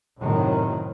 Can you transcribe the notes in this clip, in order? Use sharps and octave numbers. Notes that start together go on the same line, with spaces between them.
F#2 A2 C3 D#3 F#3